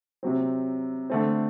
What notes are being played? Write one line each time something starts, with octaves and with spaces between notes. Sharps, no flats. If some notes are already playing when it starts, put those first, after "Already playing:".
C3 F#3 C4
D3 A3 C4